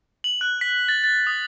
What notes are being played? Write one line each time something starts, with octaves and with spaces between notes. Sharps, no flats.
F#7
F#6
B6
A6
A6
D#6